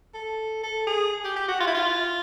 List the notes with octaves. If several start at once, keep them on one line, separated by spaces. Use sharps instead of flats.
A4
A4
G#4
G4
G4
F#4
F4
E4
F4